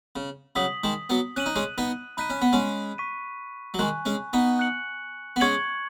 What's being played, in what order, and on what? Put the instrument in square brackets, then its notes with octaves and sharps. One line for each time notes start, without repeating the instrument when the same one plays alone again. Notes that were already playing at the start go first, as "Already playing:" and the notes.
[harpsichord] C#3
[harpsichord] C#3 F#3 [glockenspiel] D#6 B6 F#7
[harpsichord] D#3 G#3
F#3 B3
[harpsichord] C#4 [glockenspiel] F#6 D#7 F#7
[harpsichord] D#4
G#3 C#4
B3 D#4
[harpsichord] D#4 [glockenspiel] B5 F#6 B6 D#7
[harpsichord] C#4
B3
G#3 C#4
[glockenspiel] C#6 B6 D#7
[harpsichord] F#3
[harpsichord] D#3 G#3 [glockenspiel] G#5 C#6 F#6
[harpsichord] G#3 C#4
B3 D#4
[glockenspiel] F#6 C#7 F#7
[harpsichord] B3
[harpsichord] G#3 C#4 [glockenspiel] C#6 G#6 C#7 F#7